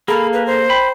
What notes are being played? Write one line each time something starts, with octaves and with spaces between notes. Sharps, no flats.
A#3 G#4 A4 F5 B5
B4
C5
G5 B5